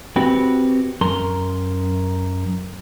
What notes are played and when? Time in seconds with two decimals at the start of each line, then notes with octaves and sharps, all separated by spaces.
0.16 C4 F#4 G4 B4
1.01 F#2 A#4 C6